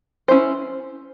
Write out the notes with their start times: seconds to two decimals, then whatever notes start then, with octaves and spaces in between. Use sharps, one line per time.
0.28 C#4 E4 C5